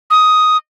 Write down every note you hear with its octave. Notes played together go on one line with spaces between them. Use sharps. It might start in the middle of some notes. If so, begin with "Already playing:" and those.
D#6